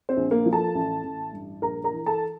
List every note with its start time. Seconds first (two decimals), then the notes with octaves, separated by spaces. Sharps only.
0.09 C4 C5
0.17 A#1
0.31 A#3 A#4
0.46 F3
0.53 A4 A5
0.75 A1
1.03 A1
1.33 G2
1.62 A#1 A#4 A#5
1.84 A#4 A#5
1.92 E3
2.06 A4 A5